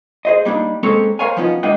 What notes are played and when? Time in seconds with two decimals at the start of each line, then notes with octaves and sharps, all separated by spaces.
0.25 G#4 C5 D#5
0.45 G3 A#3 D4 D#4
0.83 G#3 A#3 C4 C#4 A4 C#5
1.19 A#4 C5 C#5 F5 G#5
1.37 F3 B3 C#4 D#4 F4 F#4
1.63 G#3 A#3 D4 F#4 D#5 G5